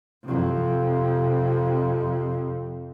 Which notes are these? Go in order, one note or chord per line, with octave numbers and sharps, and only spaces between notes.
F2 C3